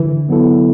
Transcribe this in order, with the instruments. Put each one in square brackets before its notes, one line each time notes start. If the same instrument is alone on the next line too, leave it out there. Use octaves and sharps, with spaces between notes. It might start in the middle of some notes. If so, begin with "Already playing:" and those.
Already playing: [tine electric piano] D3 [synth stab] E3
[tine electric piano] F#3 B3 E4 A4